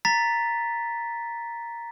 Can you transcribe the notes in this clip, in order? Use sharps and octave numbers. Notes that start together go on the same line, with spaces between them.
A#5 A6 B6